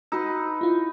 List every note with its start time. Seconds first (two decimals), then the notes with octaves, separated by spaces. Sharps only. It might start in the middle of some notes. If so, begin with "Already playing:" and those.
0.12 D#4 F#4 B4 E6
0.61 E4 F4